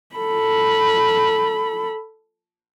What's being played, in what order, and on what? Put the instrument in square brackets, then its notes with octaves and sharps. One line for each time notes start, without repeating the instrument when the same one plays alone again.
[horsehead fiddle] A4 B5